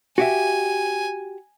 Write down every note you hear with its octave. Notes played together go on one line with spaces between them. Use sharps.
F#4 G4 E5 G#5